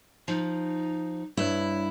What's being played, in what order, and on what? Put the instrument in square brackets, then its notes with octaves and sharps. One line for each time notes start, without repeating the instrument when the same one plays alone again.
[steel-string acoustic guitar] F3 [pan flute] D#4
[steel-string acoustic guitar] G2 E4 [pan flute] C#5